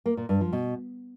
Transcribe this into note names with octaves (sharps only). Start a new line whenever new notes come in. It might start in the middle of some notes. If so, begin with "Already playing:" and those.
A#3
A#2
G2
F3
B2